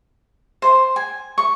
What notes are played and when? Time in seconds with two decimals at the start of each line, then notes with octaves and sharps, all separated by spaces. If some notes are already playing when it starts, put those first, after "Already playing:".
0.62 C5
0.96 G#5
1.38 C#6